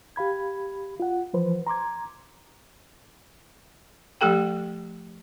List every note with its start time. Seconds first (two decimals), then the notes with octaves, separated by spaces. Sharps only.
0.16 G4 F5 B5 G#6
1.00 F4 F#5
1.33 E3 F3 B4 C5
1.67 A#5 C6 D6 G#6
4.21 F3 A3 G4 A4 G5